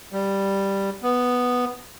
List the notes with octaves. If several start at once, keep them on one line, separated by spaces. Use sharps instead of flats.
G3
B3